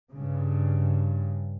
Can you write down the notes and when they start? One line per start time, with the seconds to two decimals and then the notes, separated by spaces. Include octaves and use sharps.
0.14 G2 C#3